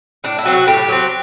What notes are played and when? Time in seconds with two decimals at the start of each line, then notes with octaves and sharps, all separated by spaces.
0.24 A2 D4
0.38 E4
0.45 F#3 C4
0.53 F#4
0.67 A2 G4
0.88 F#3 C4